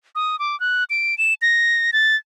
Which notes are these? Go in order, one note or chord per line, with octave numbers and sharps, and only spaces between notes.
D#6
D6
F#6
D7
E7
A#6
A6